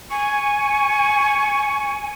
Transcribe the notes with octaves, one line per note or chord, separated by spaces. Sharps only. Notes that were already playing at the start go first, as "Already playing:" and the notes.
G#5 C#6